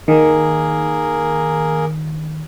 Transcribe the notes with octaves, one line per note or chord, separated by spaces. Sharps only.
D#3 A#3 G#4 A#4